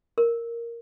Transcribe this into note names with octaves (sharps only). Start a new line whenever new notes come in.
A#4